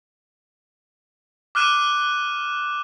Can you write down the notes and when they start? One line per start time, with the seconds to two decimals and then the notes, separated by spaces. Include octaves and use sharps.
1.55 D6 F6 F#6 D#7 E7